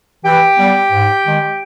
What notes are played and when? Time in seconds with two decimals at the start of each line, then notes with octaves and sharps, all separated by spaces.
0.24 E3 G4 G5
0.57 G3 B3
0.91 G#2
1.24 D#3 G#3